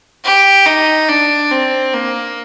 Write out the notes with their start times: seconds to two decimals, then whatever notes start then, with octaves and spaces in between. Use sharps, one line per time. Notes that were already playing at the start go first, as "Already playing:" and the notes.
0.24 G4
0.66 D#4
1.09 D4
1.51 C4
1.94 A#3